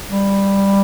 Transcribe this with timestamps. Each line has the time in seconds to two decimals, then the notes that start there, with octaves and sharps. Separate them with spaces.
0.09 G3